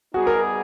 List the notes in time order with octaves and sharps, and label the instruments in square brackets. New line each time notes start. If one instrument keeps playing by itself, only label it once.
[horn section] G3 B3 D#4 G#4 [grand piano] F#4
[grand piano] A#4